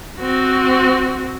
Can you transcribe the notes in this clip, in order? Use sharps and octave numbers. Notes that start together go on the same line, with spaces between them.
C4 F#4